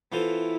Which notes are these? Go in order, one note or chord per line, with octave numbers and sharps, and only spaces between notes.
E3 B3 E4 F4 A4 C5